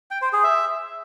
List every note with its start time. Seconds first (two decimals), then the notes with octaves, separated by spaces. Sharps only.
0.11 G5
0.22 C5
0.33 G#4
0.44 E5